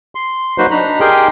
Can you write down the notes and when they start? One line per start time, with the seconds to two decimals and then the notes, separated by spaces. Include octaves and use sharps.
0.15 C6
0.58 F#3 A#3 D#4 F#4 B4 C5
0.71 D4 D#4 A#5 B5
1.00 G4 G#4 A#4 D#5 G5 C6